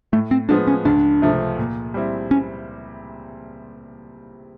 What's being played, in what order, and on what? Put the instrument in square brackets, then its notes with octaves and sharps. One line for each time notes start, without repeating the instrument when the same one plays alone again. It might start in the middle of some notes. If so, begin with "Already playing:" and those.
[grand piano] A2 [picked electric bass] A3
[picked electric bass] C4
[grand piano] F3 G#3 B3 [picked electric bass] D4
[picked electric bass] C#4
[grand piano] C#2 [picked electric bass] D4
[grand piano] C3 F3 A3
A#2
G3 C4 E4
[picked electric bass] C#4